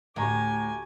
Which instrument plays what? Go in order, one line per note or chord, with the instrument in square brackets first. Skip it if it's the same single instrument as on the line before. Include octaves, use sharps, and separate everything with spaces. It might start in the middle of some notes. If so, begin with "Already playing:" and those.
[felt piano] D2 A#5 C#6 [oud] A2 [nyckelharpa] G4 G#5